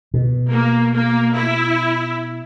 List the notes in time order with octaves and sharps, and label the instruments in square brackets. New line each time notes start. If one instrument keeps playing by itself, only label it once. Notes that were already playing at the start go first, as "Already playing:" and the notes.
[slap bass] B2
[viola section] A#3
A#3
E4